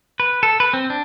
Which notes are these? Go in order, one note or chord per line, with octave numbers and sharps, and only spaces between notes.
B4
A4
B4
C4
D4